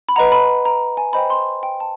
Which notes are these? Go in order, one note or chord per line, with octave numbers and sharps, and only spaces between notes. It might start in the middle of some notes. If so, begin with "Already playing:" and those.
B5
B4 D#5 F#5 A#5
B5
A#5
G#5
C5 D#5 G5 B5
C6
G5
A5